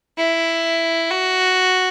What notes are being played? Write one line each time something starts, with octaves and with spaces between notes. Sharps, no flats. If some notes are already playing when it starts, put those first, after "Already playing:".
E4
F#4